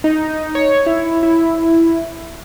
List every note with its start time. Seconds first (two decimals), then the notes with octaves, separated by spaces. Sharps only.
0.04 D#4
0.55 C#5
0.86 E4
1.23 E4